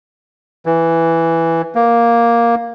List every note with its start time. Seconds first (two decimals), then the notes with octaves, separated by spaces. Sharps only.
0.66 E3
1.75 A#3